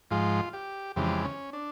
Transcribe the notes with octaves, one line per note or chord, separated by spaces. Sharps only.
G#2 F3 G#3 F4
G4
F2 C#3 E3 G#3 G4
C#4
D4